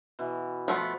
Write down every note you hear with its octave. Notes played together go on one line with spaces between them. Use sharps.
B2 E3
F3 A3 B3 F4